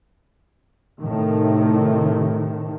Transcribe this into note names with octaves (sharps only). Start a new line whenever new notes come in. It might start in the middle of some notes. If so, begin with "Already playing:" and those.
A2 C3 D#3